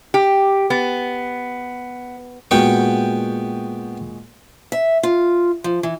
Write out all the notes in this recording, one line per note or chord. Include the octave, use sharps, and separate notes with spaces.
G4
B3
A#2 G#3 B3 F#4 G5 C#6
E5
F4
F3
E3